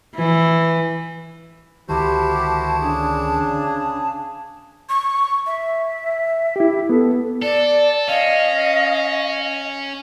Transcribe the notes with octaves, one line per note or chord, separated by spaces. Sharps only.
E3
C#2 D3 D#3 E4 F#4 G4 C5 A5
C#3 D4 G#4
C#6
E5
E4 G4
B3 A4
A4 D5
C#4 D#5 F5